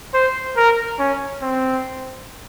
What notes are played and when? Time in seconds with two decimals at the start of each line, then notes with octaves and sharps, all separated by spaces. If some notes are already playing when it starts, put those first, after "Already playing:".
0.14 C5
0.57 A#4
0.99 C#4
1.42 C4